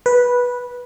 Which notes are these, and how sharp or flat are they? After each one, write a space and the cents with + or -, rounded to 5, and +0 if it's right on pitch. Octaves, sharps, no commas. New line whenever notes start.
B4 -10